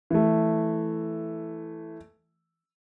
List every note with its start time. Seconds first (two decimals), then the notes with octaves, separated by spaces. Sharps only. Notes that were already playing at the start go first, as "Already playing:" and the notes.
0.10 E3 A3